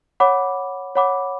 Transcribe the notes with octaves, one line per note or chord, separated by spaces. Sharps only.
C#5 F#5 B5 D6
C#5 F#5 B5 D6